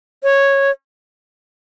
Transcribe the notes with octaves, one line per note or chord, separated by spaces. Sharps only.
C#5